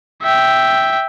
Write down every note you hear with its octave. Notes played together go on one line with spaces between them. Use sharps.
E5 G5